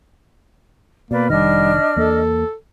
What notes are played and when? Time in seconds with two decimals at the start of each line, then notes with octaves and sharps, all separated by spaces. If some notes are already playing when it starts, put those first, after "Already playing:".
1.11 B2 A#3 B4 D5
1.30 F1 D#3 G3 D4 D#5 F6
1.96 E2 A#3 A4